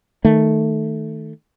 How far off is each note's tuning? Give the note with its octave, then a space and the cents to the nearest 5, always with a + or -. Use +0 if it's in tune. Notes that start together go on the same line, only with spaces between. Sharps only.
D#3 +5 A3 +0